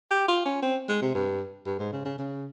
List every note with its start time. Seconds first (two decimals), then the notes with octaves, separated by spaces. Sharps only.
0.11 G4
0.28 F4
0.45 C#4
0.62 C4
0.89 G#3
1.02 C3
1.15 G2
1.66 G2
1.79 G#2
1.92 C#3
2.05 C#3
2.19 C#3